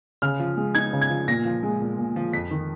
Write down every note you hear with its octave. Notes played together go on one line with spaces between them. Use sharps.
C#3 F6
F3
G#3
D#4 G#6
C#3
G#6
F3
A#2 A#6
F3
G#3
A#2
A#2
F3
F2 B6
D#3